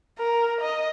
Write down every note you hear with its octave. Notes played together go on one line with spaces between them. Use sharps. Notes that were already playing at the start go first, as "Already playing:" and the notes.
A#4
D#5